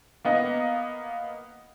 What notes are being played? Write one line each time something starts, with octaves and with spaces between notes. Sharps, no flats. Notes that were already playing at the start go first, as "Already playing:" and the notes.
A#3 B3 D#5